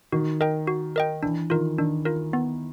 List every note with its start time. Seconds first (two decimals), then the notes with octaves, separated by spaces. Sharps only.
0.12 D#3 F#4
0.41 A#4 D#5 G5
0.67 F#4
0.96 A#4 D#5 G5
1.23 E3 D4
1.50 D#3 F4 A#4
1.78 D#3 D4
2.05 F4 A#4
2.33 B3